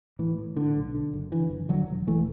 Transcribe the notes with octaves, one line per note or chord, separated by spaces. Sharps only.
A2 E3
A2
A2 D3
B1
D3
F#1
D3 E3
F#1
E1 D3 F#3
E1
E1 E3 A3